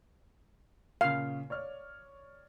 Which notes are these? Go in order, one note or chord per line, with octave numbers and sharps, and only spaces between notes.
A#2 C#3 F5
C#5 D5 F6